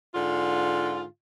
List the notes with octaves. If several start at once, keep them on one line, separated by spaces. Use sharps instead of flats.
G#2 D3 F4